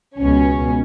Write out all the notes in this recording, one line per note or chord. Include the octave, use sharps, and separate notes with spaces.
C#2 B2 C#4